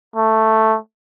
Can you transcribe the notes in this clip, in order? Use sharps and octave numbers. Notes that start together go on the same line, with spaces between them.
A3